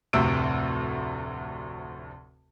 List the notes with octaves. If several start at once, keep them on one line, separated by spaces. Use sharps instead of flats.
F1 D2 A2 C3 E6 D7